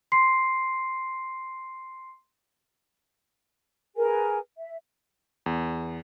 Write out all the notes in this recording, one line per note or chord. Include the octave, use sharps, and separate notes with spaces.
C6 C7
G#4 A#4 B4 G#5
E5
E2